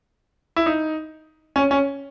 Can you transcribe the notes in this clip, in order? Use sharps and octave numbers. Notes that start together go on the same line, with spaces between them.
E4
D#4
C#4
C#4